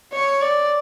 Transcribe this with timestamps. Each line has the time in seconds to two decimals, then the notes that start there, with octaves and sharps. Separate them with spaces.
0.13 C#5
0.42 D5